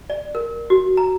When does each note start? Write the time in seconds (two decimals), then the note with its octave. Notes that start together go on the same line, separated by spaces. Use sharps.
0.10 D5
0.35 A#4
0.70 F#4
0.97 A#5